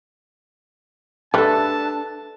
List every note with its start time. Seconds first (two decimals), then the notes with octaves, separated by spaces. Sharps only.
1.34 G3 A3 D4 A4 B4 A5